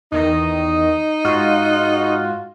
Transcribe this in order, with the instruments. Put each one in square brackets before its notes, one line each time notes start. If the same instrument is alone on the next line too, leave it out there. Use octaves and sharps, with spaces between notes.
[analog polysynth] E2 D#3 D#5 [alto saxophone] D#4
[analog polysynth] G#2 F4 F#4